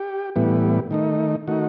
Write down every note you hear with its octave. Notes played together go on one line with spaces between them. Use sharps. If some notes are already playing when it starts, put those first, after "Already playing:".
Already playing: G4
A2 E3 G3 B3
D#3 A3 D#4
D#3 A3 D#4 F#4